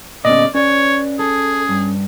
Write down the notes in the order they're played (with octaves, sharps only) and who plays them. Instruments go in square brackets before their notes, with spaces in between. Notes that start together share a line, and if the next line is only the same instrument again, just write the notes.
[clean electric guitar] A#2 B3 C#4 [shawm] D5 [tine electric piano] D#5
[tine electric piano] C#4 [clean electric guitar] B4 D5 [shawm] C#5
[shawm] G#4 [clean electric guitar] A4
[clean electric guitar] G2